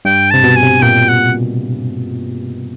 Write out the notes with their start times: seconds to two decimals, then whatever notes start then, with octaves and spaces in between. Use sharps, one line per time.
0.05 G2 G5
0.30 C3 A5
0.44 B2
0.56 G#5
0.63 C3
0.82 A#2 G5
1.08 F#5